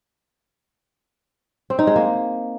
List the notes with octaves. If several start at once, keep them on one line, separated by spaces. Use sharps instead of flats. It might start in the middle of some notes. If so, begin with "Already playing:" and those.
C4
D#4
G#3
A#3